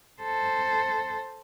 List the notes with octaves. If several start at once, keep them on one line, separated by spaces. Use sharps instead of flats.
A4 C5